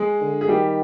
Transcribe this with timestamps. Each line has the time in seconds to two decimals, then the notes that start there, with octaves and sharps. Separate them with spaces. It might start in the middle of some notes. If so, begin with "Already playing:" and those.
Already playing: G#3 G#4
0.21 D3
0.41 G#4
0.48 D#3 G3 G4